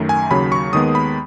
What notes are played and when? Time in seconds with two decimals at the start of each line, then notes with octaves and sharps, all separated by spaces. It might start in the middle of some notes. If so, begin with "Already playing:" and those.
Already playing: F#2 D#3 A3
0.09 G#5
0.31 D#2 C#3 F#3 B5
0.52 C#6
0.73 D#2 D#3 G#3 B3 D#6
0.95 B5